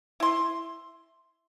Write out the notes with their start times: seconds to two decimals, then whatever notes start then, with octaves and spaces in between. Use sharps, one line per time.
0.20 E4 C6